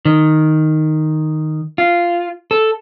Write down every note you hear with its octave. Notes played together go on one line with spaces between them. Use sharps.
D#3
F4
A4